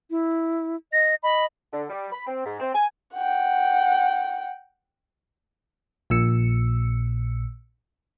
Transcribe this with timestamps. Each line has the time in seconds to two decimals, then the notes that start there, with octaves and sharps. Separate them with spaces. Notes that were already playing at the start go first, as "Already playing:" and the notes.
0.10 E4
0.93 D#5 A#6
1.23 D#5 B5
1.72 D3
1.89 G3
2.12 B5
2.27 C4
2.45 G#2
2.60 C4
2.75 G#5
3.15 F#5 G5
6.10 A#1 A#2 E6 C#7